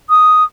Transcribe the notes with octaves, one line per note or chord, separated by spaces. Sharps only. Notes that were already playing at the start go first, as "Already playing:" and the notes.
D#6